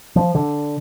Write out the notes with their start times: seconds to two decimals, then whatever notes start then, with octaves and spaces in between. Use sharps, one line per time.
0.16 F3
0.35 D3